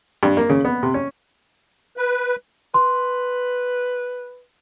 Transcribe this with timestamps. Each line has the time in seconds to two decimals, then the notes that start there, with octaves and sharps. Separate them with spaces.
0.23 G2
0.37 A#3
0.50 C#3
0.65 B3
0.83 C3
0.94 C#4
1.97 B4
2.74 B4 C6